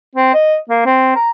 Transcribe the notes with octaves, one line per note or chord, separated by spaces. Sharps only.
C4
D#5
A#3
C4
A#5